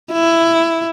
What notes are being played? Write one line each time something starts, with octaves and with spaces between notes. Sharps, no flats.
E4